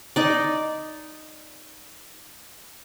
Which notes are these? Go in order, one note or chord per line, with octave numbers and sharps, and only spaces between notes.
D#4 D5